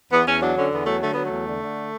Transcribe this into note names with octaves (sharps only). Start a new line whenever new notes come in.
E2 B3
E2 C#4
F#3 D4
D3 C#4
E2 B3
F#3 A3
D3 A3
F#3 B3
A3
E2
D3
D3